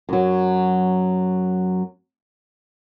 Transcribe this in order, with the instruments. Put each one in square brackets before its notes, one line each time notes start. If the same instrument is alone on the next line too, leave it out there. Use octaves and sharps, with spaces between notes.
[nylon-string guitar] F#2 F#3